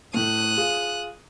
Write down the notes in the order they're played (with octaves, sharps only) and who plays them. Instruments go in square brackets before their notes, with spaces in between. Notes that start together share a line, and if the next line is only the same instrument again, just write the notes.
[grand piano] A2 A3 [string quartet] D#6 F#6
[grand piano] F4 G#4